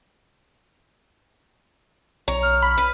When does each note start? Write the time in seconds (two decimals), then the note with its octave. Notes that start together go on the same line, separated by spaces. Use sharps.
2.28 B1 C#5 A#5
2.43 F6
2.62 B5
2.78 B4